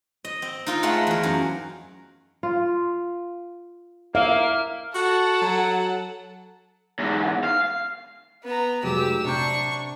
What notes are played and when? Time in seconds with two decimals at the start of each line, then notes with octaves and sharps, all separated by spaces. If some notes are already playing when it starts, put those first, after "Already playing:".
0.25 D#5
0.42 C4
0.66 D#4 F4 A#4
0.83 G#3 A3 F4 F#5
1.07 E2 A#4
1.23 F#2
2.43 F4
4.15 A#3 E5 F5 F6
4.94 F#4 A4 F#5
5.42 F#3
6.99 E2 G#2
7.44 F5
8.43 B3 A#5
8.83 F1 F#3 G#3 G4 E6
9.25 C3 D4 A#5 C#6 G6